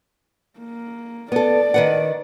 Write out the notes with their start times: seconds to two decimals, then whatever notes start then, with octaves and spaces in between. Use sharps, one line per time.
0.60 A#3
1.32 B3 A4 D5
1.74 D#3 B4 F#5